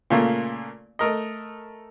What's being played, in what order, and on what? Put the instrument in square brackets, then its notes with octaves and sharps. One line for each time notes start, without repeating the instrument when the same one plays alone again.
[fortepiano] A#2 C#3 A3 A#3
A3 A#4 D#5